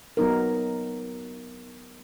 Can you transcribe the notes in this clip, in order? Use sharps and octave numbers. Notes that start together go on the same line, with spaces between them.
F#3 B3 D#4 A#4